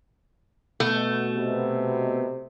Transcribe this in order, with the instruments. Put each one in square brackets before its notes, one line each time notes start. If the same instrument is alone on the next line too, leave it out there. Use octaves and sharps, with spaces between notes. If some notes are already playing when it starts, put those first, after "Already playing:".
[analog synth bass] B2 [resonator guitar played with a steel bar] A3
[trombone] C3